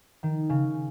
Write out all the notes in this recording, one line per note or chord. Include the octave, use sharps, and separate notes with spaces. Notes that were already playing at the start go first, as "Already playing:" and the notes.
D#3
C#3